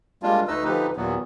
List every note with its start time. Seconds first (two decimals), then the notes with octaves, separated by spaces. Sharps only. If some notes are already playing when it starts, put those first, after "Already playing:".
0.23 G3 G#3 A#3 D4 F4
0.48 D2 A3 D#4 B4 D#5 E6
0.65 D3 E3 F3 D#4 G4 B4
0.97 D#2 A#2 E3 F#3 B3